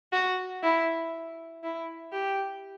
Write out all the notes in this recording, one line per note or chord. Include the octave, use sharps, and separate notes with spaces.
F#4
E4
E4
G4